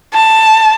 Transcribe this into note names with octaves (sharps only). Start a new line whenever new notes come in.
A5